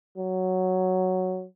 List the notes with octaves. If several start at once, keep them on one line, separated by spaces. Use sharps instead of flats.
F#3